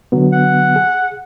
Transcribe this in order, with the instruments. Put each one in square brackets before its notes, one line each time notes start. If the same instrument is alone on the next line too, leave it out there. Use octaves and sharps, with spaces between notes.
[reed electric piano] D3 F#3 B3
[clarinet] F#5
[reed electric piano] G#4